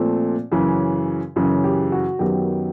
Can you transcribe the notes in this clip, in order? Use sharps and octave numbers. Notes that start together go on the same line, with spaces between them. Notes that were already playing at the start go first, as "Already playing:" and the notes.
Already playing: A#2 F3 A3 C4
F#2 C#3 E3
F#2 C#3 E3
G4
F#4
F#2 D#3 F#3 B3 G4